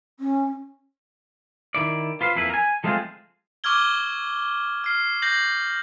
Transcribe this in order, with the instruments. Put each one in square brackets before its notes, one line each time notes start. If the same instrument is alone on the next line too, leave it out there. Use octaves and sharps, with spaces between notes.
[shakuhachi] C#4
[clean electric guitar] D#3 E4 D5
F4 B4 C5 F5
F2 A#3 E4 B4
A#4 G#5
F3 G#3 A3 C4 F4 G#4
[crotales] C#6 D6 E6 F6 G#6 G7
F6 C7
G6 A#6 C7 F#7